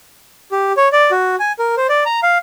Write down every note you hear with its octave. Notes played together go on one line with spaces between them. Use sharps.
G4
C#5
D5
F#4
G#5
A#4
C5
D5
A#5
F5